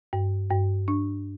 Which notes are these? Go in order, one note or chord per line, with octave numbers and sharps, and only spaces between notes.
G2
G2
D4